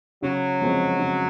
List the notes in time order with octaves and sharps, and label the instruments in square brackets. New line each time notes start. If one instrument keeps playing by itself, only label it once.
[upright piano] C#3 [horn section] F#3
[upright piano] F3 G#3 C4
C#3